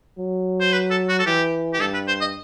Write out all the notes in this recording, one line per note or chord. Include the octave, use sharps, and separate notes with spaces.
F#3
C5
B4
A4
F#4
A4
E3 G4
G4
G2 A4
B4
C5
D#5